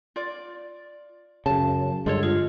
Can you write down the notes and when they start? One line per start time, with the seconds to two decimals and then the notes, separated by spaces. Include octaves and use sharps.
0.16 F4 D5
1.46 F#2 C#3 A5
2.06 G2 D3 G#3 F4 A4 C#5
2.23 F4 G#4